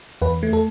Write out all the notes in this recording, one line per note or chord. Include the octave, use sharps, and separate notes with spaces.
E2 B4
A3
A4